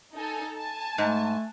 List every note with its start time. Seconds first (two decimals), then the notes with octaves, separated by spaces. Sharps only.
0.13 D#4 A4 G#5
0.55 G#5 A5
0.98 G#2 A3